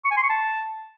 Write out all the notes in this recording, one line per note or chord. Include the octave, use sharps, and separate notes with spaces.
C#6
G#5
C6
C#6
A5